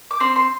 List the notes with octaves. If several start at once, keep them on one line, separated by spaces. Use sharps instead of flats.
D6
C4 C6
C6